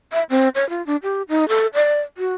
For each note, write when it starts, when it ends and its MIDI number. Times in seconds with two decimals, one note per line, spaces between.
0.12 0.23 76
0.30 0.49 60
0.55 0.68 73
0.69 0.84 65
0.87 0.96 62
1.03 1.22 67
1.29 1.48 63
1.49 1.67 69
1.74 2.01 74
2.18 2.35 66